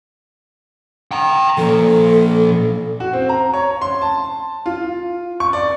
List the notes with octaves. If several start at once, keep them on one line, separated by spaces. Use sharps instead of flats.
G5 A#5
A#2 F3 A4
F#4
C4
A#5
C#5
C6
A5
F4
C#6
D5